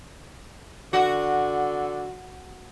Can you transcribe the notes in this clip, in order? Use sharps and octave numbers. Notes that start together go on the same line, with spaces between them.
D3 F#4